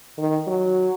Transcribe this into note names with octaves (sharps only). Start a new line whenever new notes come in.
D#3
F#3